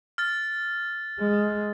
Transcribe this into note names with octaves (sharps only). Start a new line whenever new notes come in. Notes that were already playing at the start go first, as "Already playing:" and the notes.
F6 A6
G#3